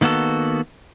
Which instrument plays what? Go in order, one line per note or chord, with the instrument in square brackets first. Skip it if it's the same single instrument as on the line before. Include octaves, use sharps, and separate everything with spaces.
[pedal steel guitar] D#3 A#3 B3 F#4 A4